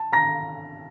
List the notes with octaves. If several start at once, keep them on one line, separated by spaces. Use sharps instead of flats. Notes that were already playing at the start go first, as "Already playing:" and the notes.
Already playing: A5
A#5 A#6